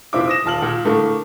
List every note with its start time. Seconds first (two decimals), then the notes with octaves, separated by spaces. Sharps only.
0.13 F1 C4 E4 F4 D6
0.27 D#6 A#6 E7
0.45 D#1 F4 A5 F6 F#7
0.62 A#2
0.84 A2 D3 A3 A#3